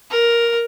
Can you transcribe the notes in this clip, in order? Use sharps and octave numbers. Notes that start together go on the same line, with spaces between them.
A#4